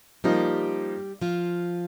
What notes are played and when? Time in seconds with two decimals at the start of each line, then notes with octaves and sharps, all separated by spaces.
0.24 F3 G3 A#3 D#4 G4
1.21 F3 F4